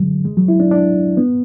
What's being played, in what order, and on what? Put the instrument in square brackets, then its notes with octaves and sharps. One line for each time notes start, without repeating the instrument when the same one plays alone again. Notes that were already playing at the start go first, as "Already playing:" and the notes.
Already playing: [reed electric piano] D3 F#3 G#3
G#3
F#3
E4
D4
D4
B3